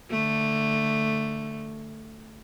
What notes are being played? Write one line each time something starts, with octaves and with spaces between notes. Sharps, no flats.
D3 A3